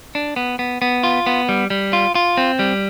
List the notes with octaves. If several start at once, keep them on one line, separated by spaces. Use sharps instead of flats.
D4
B3
B3
B3
F4
B3
G3
G3
F4
F4
C4
G3